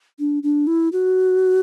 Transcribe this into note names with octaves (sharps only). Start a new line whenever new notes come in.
D4
D4
E4
F#4